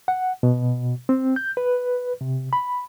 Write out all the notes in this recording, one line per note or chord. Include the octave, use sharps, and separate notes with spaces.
F#5
B2
C4
G6
B4
C3
B5